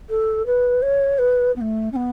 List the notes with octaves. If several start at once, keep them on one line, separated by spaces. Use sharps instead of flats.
A4
B4
C#5
B4
B3
A3
C#4
B3